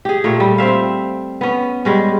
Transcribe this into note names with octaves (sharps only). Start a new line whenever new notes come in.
G4 G#4
A#2 A3 C#5
G3
C4 C5 E5 F5
B3 C#4
G3 G#3 C#4